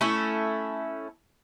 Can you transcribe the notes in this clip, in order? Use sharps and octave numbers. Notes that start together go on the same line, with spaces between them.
A3 C#4 E4 A4